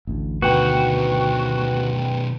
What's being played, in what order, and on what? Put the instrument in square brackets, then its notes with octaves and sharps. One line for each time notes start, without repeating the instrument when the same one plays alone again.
[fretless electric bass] A1 D2
[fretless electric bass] D2 [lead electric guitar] B2 D#3 [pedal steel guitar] F#4 [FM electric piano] B4 G5